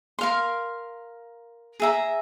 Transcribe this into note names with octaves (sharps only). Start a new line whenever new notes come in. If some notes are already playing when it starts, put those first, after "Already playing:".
A#4 F5 C6
G#4 E5 A#5